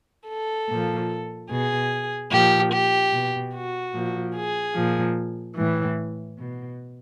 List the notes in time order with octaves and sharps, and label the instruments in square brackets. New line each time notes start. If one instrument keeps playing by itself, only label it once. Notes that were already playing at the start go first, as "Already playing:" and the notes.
[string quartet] A4
A#2 F3
B2 G#4
A#2 F3 G4
G4
B2
F#4
A#2 F3
G#4
A#2 F3
A2 E3
B2